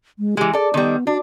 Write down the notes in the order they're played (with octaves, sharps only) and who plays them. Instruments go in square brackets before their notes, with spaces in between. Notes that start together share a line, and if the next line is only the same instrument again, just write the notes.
[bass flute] G#3
[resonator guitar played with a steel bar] E3 G#3 [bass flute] G4
[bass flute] G#4 [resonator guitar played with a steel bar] A4 D5
[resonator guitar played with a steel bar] D#3 G3 [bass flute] B3
[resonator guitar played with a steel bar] D4 [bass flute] F#4